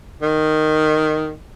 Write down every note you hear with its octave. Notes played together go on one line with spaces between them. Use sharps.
D#3